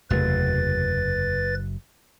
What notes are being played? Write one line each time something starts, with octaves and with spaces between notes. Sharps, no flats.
F#1 E2 C3 A3 B4 A6